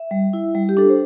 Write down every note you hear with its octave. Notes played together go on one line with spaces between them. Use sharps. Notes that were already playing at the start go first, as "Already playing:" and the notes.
Already playing: E5
G3
E4
G3
G4
D4 A4
C5